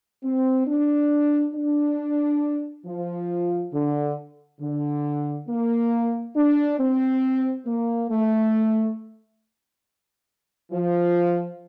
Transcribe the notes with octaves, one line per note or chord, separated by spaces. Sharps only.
C4
D4
D4
F3
D3
D3
A#3
D4
C4
A#3
A3
F3